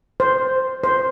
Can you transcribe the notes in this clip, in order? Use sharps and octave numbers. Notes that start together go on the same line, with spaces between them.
C5
C5